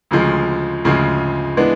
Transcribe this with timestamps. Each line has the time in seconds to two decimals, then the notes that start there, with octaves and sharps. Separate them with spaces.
0.11 D2 C#3 F3 G#3
0.84 D2 C#3 F3 G#3
1.57 E3 G#3 B3 D4